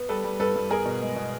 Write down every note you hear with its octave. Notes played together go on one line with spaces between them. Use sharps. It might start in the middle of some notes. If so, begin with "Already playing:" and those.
Already playing: B3
G3 A4 B4
G3
G2 A4 B4
G2
B3 G#4 A#4
B2
G#3
B2